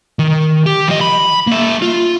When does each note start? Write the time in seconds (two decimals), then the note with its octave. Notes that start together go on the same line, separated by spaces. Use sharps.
0.19 D#3
0.66 G4
0.88 F3 D#5
1.01 B5
1.47 A#3 E5
1.82 F4